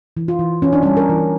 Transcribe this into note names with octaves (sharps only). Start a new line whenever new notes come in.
E3
F4
E3
E3 C#4
D4
G3 C#4
A#4
E3